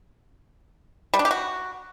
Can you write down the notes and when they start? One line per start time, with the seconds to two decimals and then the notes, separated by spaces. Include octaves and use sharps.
1.14 G3
1.19 D4
1.25 G4
1.31 F#4